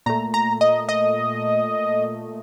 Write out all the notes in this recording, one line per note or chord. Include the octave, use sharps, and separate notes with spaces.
A#2 A3 A#5
A#5
D#5
D#5